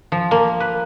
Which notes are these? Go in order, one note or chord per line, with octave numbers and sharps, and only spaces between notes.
F3
A#3
B4